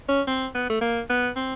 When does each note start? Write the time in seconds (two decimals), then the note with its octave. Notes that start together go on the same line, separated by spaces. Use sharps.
0.09 C#4
0.28 C4
0.55 B3
0.70 A3
0.81 A#3
1.10 B3
1.36 C4